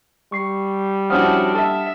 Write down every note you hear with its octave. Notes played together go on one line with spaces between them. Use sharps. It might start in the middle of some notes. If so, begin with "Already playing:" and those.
G3 C#6 C7
F3 C#4 D4 E4 F#4 F#5 D#6 F6
A4 E5